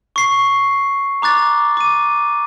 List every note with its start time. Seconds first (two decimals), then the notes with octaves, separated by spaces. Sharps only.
0.16 C#6 C7
1.22 A#5 D6 F#6 A6
1.77 D6 D#7